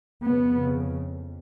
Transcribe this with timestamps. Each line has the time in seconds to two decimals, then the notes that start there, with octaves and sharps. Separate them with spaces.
0.25 F2 C#3 B3
0.59 C#3